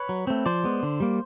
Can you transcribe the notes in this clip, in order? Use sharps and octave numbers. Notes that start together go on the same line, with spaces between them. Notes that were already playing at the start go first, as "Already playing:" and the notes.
Already playing: B4 C#5
F#3
A3 C4
F3 C5 D5
G#3 B3
D3
G3 A#3